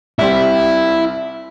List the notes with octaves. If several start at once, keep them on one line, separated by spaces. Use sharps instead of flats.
C2 G3 C4 E4